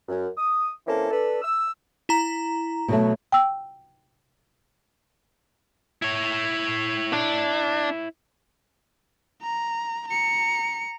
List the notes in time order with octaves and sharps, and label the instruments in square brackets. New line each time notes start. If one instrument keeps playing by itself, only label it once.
[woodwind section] F#2
D#6
E3 A#3 C4 C#4 E4 A4
D4 A4 B4
E6
[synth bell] E4 A#5
[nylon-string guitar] B2 F#3 A3
[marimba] G5 E6
[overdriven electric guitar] E4 C#5
[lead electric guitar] D4
[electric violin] A#5
A#5 C#7